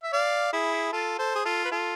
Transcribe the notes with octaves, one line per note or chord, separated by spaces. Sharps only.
E5
D5 F5
E4 G#4
F4 A4
A4 C5
G#4
F4 A4
B4
F4 A4